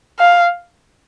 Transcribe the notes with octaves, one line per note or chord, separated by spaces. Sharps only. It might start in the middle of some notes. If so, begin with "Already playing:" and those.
F5